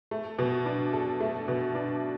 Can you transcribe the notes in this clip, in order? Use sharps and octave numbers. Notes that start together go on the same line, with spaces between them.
A3
B2
D4
A4
A3
B2
D4